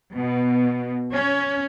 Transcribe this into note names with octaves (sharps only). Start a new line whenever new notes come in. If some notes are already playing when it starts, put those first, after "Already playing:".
B2
C#4